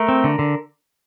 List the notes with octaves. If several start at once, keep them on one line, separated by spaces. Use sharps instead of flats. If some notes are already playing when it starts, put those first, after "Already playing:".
Already playing: A3 A#4
C4
D3
D3